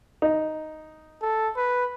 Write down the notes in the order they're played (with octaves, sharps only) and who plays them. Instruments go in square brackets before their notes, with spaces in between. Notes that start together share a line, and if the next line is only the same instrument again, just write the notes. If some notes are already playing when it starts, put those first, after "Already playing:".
[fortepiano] D#4
[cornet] A4
B4